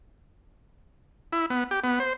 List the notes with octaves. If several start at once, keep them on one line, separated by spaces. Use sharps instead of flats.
E4
B3
G4
B3
C5